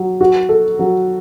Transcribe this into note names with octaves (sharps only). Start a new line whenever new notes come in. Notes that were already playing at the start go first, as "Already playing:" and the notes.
Already playing: F#3
F#4
A4
F#3